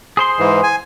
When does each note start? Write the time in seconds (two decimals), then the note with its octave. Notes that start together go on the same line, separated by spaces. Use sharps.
0.17 G#4 C5 C6
0.39 G#2 E3
0.63 G#5